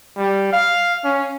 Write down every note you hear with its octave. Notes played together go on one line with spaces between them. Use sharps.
G3
F5
C#4